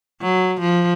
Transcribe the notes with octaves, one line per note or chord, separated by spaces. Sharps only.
F#3
F3